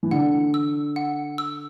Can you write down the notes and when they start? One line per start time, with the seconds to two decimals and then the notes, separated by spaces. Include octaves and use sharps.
0.03 E3
0.11 D3 F#5
0.54 E6
0.96 F#5
1.38 E6